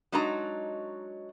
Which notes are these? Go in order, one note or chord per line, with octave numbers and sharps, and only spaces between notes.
F#3 G#3 D4 D#4 F#4 A#5